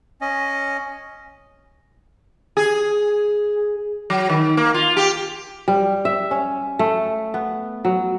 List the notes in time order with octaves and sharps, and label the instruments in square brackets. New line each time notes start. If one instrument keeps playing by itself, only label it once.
[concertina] C#4 D#5
[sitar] G#4
F#3
D#3
A#3
F4
G4
[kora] G3
E5
C#4
A3
B3
F#3